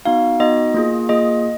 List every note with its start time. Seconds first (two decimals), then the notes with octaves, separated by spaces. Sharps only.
0.05 B3 D#4 F#4 F5
0.40 B3 D#4 F#4 D#5
0.74 A#3 F4 G#4
1.09 A#3 F4 G#4 D#5